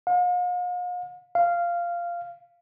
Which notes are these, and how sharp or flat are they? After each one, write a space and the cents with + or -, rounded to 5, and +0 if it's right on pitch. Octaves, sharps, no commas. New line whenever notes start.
F5 +45
F5 -10